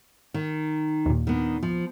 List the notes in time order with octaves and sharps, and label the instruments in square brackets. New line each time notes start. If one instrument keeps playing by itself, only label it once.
[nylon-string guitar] D#3
[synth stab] D#2 A#2
[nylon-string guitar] D#3 B3 D4
F3